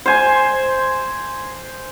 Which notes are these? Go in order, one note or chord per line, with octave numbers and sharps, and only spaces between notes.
C5 G#5